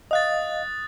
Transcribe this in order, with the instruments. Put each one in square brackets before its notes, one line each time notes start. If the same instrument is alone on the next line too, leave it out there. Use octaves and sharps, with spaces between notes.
[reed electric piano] D#5 F5 [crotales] D#6 F#6 A6